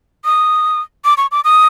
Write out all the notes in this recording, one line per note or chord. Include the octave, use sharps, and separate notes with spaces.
D#6
D6
C#6
D6
D#6